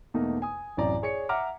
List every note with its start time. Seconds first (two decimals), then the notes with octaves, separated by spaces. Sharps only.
0.14 E2 B2 A3 A#3 D#4
0.42 G#5 D#6
0.77 A1 F#2 C3 D5 A#5
1.03 G#4 C#5 D5 C#7
1.29 E5 F#5 A#5 D6 F6